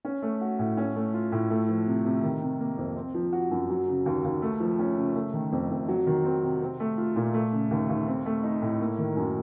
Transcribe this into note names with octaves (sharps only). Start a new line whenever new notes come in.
C#4
A3
F#4
A2
C#4
A3
F4
A2
A3
F3
C3
C3
D#3
C3
A#3
F2
C4
F3
F#4
F#2
F#3
C#3
D#2
D#2
A3
F3
C#4
C#3
A3
D#3
F2
F2
F#3
D#3
C4
C3
C4
A3
F4
A#2
A3
C#3
D#2
D#2
C4
A3
D#4
A2
A#3
D#3
F#2